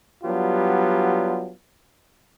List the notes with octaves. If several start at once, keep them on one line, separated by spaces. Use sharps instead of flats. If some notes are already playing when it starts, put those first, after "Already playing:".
F#3 G3 B3 D4 F4 G4